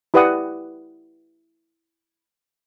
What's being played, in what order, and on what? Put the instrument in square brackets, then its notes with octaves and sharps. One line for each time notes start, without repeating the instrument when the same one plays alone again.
[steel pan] E4 G4 B4 D5 F#5 D#6